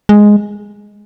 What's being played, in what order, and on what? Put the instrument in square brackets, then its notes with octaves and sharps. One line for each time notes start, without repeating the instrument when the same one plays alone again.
[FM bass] G#3